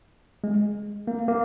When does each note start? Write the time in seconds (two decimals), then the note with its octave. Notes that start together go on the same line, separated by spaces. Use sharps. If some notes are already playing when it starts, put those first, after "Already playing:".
0.44 G#3
1.07 A#3
1.28 A#3